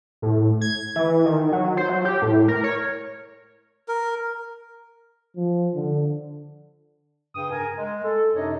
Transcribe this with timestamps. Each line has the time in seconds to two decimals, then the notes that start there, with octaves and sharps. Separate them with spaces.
0.22 A2
0.61 G#6
0.96 E3
1.25 D#3
1.52 F#3
1.77 C5
1.89 F#3
2.05 G4
2.22 A2
2.48 A#4
2.64 C#5
3.88 A#4
5.37 F3
5.74 D3
7.35 G2 C#3 G#4 G5 D#6
7.50 A#4 G#5
7.75 G#3
8.03 A4
8.33 F#2 C3 D4 D#4 C#5 D#5